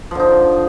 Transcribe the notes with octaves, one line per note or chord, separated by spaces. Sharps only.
D3 F3 D#4